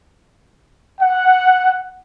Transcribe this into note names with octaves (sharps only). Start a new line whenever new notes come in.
F#5